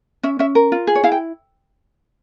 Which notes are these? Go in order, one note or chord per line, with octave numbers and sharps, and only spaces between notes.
C#4 E5
C#4 E5
A#4
F4
G#4
C#5
E4 F5
G5